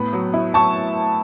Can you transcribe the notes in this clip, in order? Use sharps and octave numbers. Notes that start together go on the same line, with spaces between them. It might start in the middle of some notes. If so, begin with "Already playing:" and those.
Already playing: A2 B3 B5
F#3
E4
F#3 A5 C#6